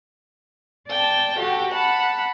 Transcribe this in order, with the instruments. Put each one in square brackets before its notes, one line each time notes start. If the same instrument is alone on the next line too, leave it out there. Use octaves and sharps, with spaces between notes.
[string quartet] D5 G5 A5
F#4 G4 A4 G5
F#5 A5 B5